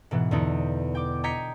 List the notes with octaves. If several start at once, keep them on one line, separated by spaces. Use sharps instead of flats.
G#2 B2 E3 B3
E2 D3 B3 D#4
G5 D6
D#5 G5 A#5 G#6 B6 C#7